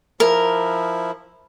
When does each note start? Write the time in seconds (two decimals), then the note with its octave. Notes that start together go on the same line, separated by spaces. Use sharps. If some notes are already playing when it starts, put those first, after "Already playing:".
0.20 F3 E4 A#4